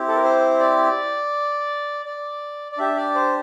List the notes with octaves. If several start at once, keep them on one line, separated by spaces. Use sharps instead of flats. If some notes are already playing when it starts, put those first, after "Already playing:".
Already playing: C4 E4 G4
A4
A#4
C5
D5
D5
D5
D4 G4 E5
D5
C5